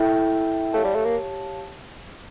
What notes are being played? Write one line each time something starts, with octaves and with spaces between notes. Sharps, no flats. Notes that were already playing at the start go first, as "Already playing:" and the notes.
Already playing: E4 A4 E5 G5
A3 G4 C#5 F5 A5
G3
A3
A#3